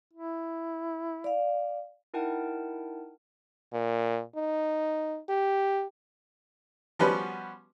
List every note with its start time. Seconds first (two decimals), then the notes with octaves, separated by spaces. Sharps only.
0.13 E4
1.24 D5 F5
2.14 D#4 E4 A#4 F#5 G5 A5
3.73 A#2
4.36 D#4
5.29 G4
6.99 F3 G3 B3 C#4 F#4 B4